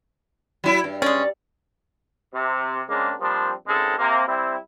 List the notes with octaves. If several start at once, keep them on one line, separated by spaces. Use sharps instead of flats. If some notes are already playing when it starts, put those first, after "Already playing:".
F#3 E4
G2
G#3 C#4 D5
C3
C#3 G#3 A#3 C4 D4
F3 G3 A#3 C4 D4
G#1 C#3 G#3 C4 A4
C3 A#3
G3 C4 E4